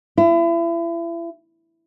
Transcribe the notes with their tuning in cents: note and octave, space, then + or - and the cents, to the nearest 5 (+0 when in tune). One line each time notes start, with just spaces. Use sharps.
E4 +35